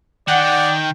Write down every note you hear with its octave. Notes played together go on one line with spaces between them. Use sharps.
D#3 D5 F#5 G5